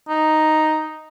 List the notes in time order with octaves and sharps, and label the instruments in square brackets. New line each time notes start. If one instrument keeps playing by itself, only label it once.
[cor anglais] D#4